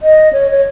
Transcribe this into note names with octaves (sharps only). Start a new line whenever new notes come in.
D#5
C#5
C#5